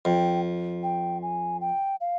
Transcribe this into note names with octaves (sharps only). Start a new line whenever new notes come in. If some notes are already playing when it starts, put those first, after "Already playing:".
F2 G5
G5
G#5
G5
F5